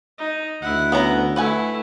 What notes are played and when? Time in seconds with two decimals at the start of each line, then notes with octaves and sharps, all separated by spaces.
0.18 D#4
0.62 D2 E4 F#5
0.92 B3 C#4 A#5
1.36 A3 E4 B4 F#5 G#5